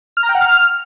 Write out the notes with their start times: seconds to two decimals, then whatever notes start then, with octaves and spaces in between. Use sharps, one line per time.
0.17 F6
0.23 A#5
0.29 G5
0.35 F#5
0.41 F6